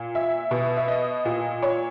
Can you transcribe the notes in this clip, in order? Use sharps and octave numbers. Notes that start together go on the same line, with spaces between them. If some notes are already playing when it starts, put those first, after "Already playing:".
Already playing: A#2
E5
B2
E5
D#5
A#2
C#5